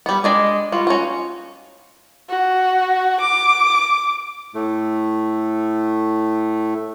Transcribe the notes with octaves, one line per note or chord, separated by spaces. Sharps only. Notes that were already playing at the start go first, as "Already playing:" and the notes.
G3 B3
G#3 D4 D5 D#5
G3 F4 F#4
C#4 D#4 F#4
F#4
D6
A2 A3